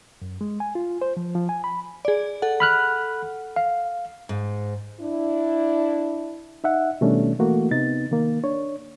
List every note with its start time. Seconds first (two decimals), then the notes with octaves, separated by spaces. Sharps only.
0.22 F#2
0.41 G#3
0.60 G#5
0.75 F4
1.02 C5
1.17 F3
1.35 F3
1.49 G#5
1.64 B5
2.05 G#4 D5
2.42 A4 F#5
2.60 B5 F6 F#6
3.56 F5
4.29 G#2
5.00 D4 E4
6.64 D#4 E5 F#5
7.01 B2 D#3 G3 A3 C#4 D4
7.39 E3 A3 A#3 F#4
7.71 C3 B3 D#4 A6
8.11 D#3 A#3
8.44 D4 C#5